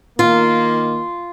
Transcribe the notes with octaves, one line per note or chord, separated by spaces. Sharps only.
D#3 A#3 F4